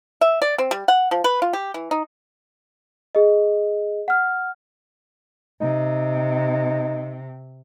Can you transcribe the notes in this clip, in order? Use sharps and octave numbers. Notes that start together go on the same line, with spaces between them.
E5
D5
C4
G3
F#5
F3
B4
F4
G4
E3
D#4
G#4 D#5
F#5 F6
C3 D#4